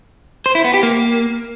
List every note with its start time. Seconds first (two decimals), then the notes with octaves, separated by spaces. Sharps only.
0.46 C5
0.55 E4
0.64 B3
0.74 G4
0.83 A#3